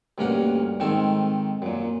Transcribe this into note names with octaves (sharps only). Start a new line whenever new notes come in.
D2 G2 A#3 C#4 A#4 F#5
G#2 D#3 C4 A4 G#5
F#2 A#2